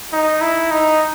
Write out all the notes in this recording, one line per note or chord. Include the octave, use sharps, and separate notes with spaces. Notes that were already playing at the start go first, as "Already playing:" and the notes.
D#4
E4
D#4